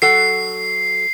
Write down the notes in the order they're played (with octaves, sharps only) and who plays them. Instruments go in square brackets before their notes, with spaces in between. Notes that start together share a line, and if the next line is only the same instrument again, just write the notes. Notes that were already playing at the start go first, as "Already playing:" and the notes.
[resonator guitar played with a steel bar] F#3 A4 F#5 [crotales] C7